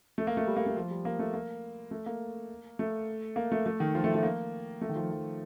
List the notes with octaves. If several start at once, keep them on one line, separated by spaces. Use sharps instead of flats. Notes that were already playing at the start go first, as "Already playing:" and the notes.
A3
A#3
A3
G3
A#3
A3
F3
G3
A#3
A3
A#3
A3
A#3
A3
A#3
A3
A3
D#3
F3
A3
A3
A#3
A3
D#3
F3
F3